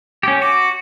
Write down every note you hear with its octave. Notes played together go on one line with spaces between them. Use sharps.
C#4 G4
F#4 D6